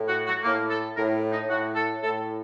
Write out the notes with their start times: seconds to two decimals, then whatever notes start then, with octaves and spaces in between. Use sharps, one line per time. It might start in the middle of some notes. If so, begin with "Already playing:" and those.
Already playing: A2
0.09 F#4
0.27 F#4
0.44 A2 A#3
0.70 A4
0.96 A2 A#4
1.32 D#4
1.49 A2 F#4
1.76 A4
2.02 A2 A4